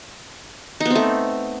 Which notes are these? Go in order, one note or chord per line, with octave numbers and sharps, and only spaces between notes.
A3 B3 C4 D#4